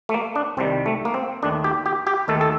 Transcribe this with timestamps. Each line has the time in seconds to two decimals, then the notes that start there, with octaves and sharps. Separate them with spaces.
0.09 A3
0.14 A#3
0.36 D4
0.57 C2 C3 D#3 G3 C4
0.86 A3
1.05 A#3
1.14 C4
1.43 D#2 D#3 A3 D4
1.64 G4
1.86 G4
2.07 G4
2.28 D#2 D#3 A3 A4
2.41 A4